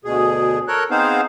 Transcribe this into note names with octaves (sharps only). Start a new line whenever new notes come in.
D2 B2 G#4
A4 A#4 C#5 F#6
B3 C4 D#4 G#4 C5 F5